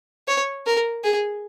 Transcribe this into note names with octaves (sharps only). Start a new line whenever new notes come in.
C#5
A#4
G#4